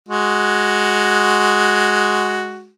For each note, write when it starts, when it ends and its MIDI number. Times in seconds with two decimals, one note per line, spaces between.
0.09 2.69 56
0.09 2.69 66